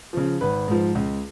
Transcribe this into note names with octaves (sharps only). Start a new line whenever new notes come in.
C#3 F3
G#1 B4
G#2 F3
C#2